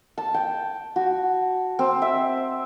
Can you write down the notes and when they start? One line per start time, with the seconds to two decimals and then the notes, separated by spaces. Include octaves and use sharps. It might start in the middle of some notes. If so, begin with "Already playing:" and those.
0.18 A5
0.34 G5
0.96 F#4
1.79 C4
2.02 E5